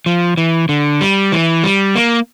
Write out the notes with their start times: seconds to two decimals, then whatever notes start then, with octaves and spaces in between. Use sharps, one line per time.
0.06 F3
0.37 E3
0.69 D3
1.01 G3
1.32 E3
1.64 G3
1.96 A#3